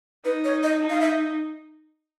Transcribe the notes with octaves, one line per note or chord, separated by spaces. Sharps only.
D#4 B4
C#5
D#5
D#4
F5
E5